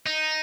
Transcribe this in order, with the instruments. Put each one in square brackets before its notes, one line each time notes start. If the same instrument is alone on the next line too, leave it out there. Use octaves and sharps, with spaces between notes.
[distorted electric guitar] D#4